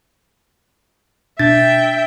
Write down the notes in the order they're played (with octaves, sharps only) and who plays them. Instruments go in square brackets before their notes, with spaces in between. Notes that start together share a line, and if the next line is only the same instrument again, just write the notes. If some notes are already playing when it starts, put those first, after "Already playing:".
[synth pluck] B2 D4 G6 [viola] E5 G5 [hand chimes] A6